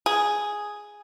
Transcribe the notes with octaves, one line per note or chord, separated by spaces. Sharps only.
G#4